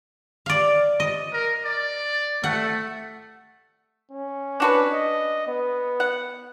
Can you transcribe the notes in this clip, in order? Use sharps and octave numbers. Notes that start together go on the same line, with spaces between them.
D5 F5
D#5
A#4
D5
A3 F#5
C#4
D4 F#4 B4
D#5
B3
F#5